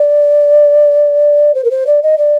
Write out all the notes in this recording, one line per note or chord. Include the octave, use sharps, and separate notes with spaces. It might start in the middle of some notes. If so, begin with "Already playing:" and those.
Already playing: D5
C5
A#4
C5
D5
D#5
D5